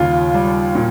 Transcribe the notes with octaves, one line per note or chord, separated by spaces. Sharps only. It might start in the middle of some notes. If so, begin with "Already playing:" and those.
Already playing: D#2 C#3 G3 F4
G3
A#2